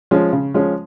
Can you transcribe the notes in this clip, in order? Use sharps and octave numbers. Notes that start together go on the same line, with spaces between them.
F3 G#3 C#4
C#3
F3 G#3 C#4